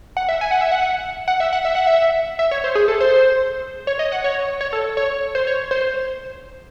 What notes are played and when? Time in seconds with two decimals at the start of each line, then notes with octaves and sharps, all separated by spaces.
0.17 F#5
0.29 E5
0.41 G#5
0.51 F#5
0.61 E5
0.72 F#5
1.28 F#5
1.40 E5
1.53 F#5
1.65 E5
1.75 F#5
1.87 E5
2.39 E5
2.51 C#5
2.64 C5
2.75 G#4
2.88 A4
3.00 C5
3.87 C#5
3.99 D#5
4.12 F#5
4.24 C#5
4.61 C#5
4.73 A4
4.97 C#5
5.35 C5
5.47 C#5
5.71 C5